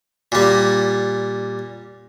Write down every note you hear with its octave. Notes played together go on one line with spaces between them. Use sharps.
A#2 G3